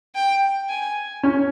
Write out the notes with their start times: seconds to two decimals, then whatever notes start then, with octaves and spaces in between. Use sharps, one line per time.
0.15 G5
0.69 G#5
1.23 C#4